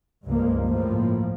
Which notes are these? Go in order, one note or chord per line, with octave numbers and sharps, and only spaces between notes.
C#2 G2 F3 G#3 A#3
A2 F3 A#3